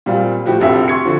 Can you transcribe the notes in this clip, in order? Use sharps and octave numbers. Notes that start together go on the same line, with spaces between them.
A#2 G3 C4 F4
A2 F3 F#4 G4
F1 A#1 G4 E5
C6 C#6 G#6 C#7
D3 F3